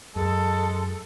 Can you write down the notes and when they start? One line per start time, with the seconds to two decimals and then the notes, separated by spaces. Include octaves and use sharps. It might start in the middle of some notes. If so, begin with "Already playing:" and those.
0.16 F#2 G#3 A4